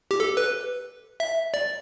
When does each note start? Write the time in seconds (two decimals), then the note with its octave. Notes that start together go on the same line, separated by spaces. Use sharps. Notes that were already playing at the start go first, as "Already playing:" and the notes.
0.11 G4
0.20 A4
0.37 B4
1.20 E5
1.54 D5